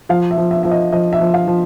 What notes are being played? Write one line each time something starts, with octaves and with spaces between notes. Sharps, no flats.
F3 F5
E5
F3
E5
F3 E5
D#5
F3 D#5
E5
F3
F5
F3